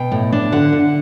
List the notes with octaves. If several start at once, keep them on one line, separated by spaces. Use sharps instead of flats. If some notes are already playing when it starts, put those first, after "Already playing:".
Already playing: B2 G5
A2
D4
D3 F#5
D3